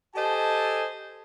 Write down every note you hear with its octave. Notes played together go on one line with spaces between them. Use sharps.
G4 A4 C5 D#5 G#5 A5